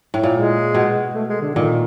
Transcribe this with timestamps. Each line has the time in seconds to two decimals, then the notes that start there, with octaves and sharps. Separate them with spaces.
0.14 A2
0.24 A#2
0.34 G#3
0.74 B2
1.15 A3
1.29 G#3
1.41 D3
1.55 A#2 D#3